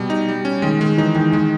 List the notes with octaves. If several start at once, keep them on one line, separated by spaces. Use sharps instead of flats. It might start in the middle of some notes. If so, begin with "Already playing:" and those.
Already playing: B2 G3
D#4
G3
C#4
D#3 G#3
D#3 G#3
E3 D#4
D#3 G#3
D#3 G#3